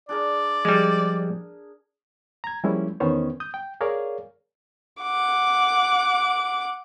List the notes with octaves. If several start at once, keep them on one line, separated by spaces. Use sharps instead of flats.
D4 G#4 A#4 D5
F3 G3 G#3
A#5 G#6
F3 G3 G#3 A#3 C#4 E4
E2 D#3 B3 C#4 C5 C#5
D#6 G6
G5
G#4 A#4 C#5 D5 F5
F#5 D6